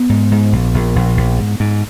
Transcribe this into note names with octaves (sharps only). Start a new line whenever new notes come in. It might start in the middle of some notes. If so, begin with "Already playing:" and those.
Already playing: B3
G#2
G#2
A#1
A#1
A#1
A#1
G#2
G#2